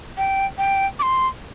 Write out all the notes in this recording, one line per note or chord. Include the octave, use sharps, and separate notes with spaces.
G5
G5
D6
C6